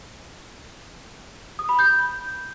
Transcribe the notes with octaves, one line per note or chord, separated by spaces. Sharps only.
D#6
B5
G6